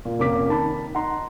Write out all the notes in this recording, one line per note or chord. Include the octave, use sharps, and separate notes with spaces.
A#2
F1 A#3 C#4 D6 B6
D#3 A5 B5
D#4 F#5 A#5 C6